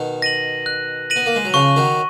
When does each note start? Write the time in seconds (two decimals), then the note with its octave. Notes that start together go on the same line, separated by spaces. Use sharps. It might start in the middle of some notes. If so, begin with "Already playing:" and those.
Already playing: B2 D#3
0.22 A#6 D#7 F#7
0.66 F#6
1.10 A#6 D#7 F#7
1.16 B3
1.26 A#3
1.35 G#3
1.45 F#3
1.54 C#3 F3 C#6
1.76 D#3 F#3